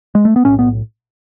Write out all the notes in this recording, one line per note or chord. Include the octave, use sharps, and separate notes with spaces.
G#3
A3
B3
B1 A2 C#4
B3